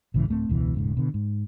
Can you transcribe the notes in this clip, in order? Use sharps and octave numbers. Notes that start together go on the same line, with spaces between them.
A#1 G#2 C#3 E3
D1 A3 C4
E1 C#2 B2 E3
D#1 G#2 C#3
B2 D3
G#2